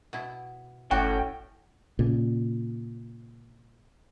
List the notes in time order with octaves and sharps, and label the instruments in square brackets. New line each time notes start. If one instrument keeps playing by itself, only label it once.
[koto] B2 E4
[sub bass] G1 [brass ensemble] A2 C#4 [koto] F#4 D5 [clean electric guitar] G5
[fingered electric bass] A#2 C#3